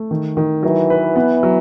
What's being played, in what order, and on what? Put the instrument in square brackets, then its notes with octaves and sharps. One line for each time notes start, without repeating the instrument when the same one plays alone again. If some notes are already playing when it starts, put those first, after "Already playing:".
Already playing: [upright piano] A3
D#3
D#3
[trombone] E3 [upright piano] F#3
[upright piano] B4
B3
F#3